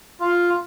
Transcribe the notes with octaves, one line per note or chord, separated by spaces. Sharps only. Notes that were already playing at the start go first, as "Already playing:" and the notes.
F4